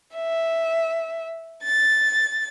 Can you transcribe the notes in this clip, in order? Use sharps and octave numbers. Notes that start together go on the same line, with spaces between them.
E5
A6